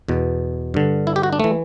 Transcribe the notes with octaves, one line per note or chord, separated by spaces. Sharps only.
E2 B2
G2 D3
E4
G4
F#4
D4
E3 A3